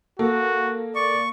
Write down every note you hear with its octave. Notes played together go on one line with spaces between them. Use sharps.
A#3 F#4 A4
D5 C#6